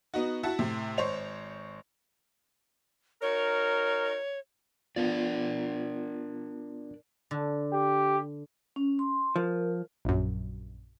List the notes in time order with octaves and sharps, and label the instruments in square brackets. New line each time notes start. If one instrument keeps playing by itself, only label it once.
[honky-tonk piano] B3 D#4 F#4
E4 F#4 F#5 A5
A2 C3
G#1 C5 C#5 F7
[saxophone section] D#4 F#4 A#4 [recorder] C#5
[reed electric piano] B3 F4 [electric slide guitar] D4 A#4 D5
[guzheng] D3
[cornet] G4
[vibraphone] C#4
C6
[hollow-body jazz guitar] F3 [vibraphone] A#4
[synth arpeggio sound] A#1 F#2